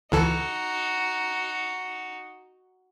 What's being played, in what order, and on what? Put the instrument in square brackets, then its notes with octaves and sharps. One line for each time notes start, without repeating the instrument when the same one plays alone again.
[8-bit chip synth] C#2 E3 A4 [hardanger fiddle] D#4 F#4